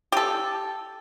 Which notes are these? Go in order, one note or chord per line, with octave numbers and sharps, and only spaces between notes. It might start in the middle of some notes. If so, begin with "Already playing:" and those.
G4 A4